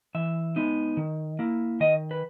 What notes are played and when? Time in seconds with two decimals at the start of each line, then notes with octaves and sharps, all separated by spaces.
0.15 E3 E5
0.56 G#3 B3 D#4
0.97 D#3
1.39 A#3 E4
1.80 D#3 D#5
2.11 B4